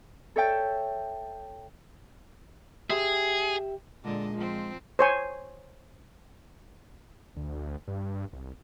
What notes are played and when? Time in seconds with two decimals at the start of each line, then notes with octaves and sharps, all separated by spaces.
0.36 A4 C#5 E5 G5 A5
2.90 G4 G#4 E5
4.04 A#2 D3 G#3 D#5
4.35 F3 C4
4.99 C5 C#5 G#5
7.36 D2
7.88 G2
8.33 C2